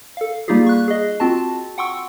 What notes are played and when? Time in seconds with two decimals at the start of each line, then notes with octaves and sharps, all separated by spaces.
0.17 A4 F5
0.48 G3 A#3 D#4 F4 G4 G#4
0.66 C#6 F#6
0.88 G#4 D#5
1.20 C4 F4 F#4 A5
1.78 F#5 G5 C6 C#6 E6